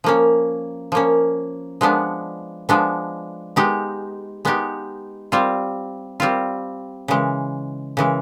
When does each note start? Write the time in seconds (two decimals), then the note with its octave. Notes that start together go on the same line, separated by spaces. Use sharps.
0.04 F3 A#3 C#4
0.92 F3 A#3 C#4
1.81 F3 G#3 B3 D4
2.69 F3 G#3 B3 D4
3.56 G#3 B3 D#4 G4
4.45 G#3 B3 D#4 G4
5.32 G3 C4 F4
6.20 G3 C4 F4
7.08 C#3 E3 G#3
7.97 C#3 E3 G#3